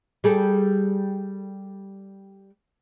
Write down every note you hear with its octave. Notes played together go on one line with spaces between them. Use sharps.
G3 G#4 A4